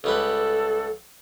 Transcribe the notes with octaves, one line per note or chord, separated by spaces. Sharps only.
C#2 G3 A4 B4